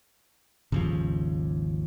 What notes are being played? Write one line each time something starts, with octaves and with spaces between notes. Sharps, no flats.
G#1 D#2 C#3 F3